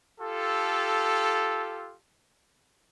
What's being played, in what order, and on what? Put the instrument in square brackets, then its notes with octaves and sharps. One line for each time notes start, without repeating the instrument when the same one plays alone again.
[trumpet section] F4 G4 A4